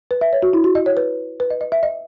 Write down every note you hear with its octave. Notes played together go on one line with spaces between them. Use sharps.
B4
E5
C#5
F#4
E4
F#4
D#5
C#5
B4
B4
D#5
D#5
E5
D#5